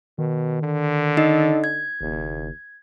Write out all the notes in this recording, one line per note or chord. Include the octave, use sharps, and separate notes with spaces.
B2 D#3
D3
D#4 D#5
G#6
F#1 D#2